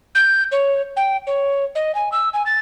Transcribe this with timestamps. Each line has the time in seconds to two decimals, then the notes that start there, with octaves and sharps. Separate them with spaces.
0.15 G6
0.52 C#5
0.97 G5
1.27 C#5
1.75 D#5
1.95 G#5
2.12 E6
2.34 G#5
2.46 A6